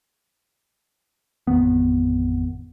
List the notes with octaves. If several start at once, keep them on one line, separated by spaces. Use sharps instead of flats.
A1 F2 D#3 B3